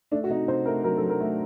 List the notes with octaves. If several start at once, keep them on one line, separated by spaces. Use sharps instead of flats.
A3 D4
F#4
C3 D#4
C3 C5
A3 A#4
F#3 A#4
F#3 A4
A#4
A3